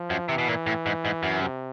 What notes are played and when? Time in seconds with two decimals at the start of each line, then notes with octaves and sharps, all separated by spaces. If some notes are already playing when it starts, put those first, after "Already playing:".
Already playing: F3
0.10 F#2
0.29 C3 E3
0.38 B2
0.48 A#2
0.66 A2
0.86 G#2
1.05 G#2
1.23 F#2
1.41 C3